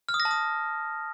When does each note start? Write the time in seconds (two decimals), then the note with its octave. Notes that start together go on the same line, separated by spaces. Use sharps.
0.09 F6
0.14 D#6
0.20 A#6
0.25 A5
0.31 D#6